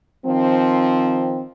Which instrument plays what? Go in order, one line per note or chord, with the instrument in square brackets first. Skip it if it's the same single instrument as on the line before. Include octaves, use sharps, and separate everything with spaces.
[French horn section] D#3 F3 C4